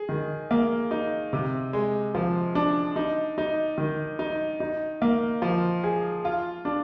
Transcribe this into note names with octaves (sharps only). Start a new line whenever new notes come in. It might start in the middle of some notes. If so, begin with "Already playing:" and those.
Already playing: G#4
D#3
A#3
D#4
C3
G#3
F3
D4
D#4
D#4
D#3
D#4
D#4
A#3
F3
G#4
F4
D4